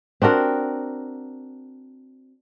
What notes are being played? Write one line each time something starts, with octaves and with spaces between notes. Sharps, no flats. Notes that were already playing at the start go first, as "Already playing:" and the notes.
C4 D4 F#4 A#4